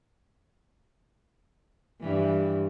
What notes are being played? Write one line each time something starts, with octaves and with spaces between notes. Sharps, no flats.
G2 E3